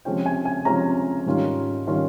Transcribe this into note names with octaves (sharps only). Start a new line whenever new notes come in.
C3 F3 G#3 C#4 F4 G5
G#5
G#5
C3 F3 G#3 C#4 F4 A#5
G#2 D#3 G3 C#4 F4
D#3 G3 C#4 F4